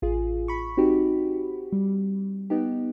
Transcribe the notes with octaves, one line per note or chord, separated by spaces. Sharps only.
A1 F4 G#4
B5 C#6
C4 D#4 F#4 G4
G3
B3 D#4 G4